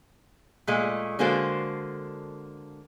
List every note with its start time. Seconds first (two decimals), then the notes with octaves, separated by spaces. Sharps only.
0.67 A#2 G#3 A3
1.19 D3 G#3 A#3 F#4 A4 C5